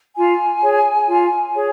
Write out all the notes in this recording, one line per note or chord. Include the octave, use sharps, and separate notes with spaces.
F4 G#5
G#4 C#5
F4
G#4 C#5